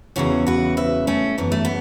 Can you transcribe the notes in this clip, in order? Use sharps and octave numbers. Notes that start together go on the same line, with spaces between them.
E2 C#3 E3 C#4 F#4
F#4 B4
B4 E5
A3 C#4
F#2 E3 B3
A3
B3